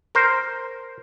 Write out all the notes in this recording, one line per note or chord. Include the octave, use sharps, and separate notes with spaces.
A#4 C5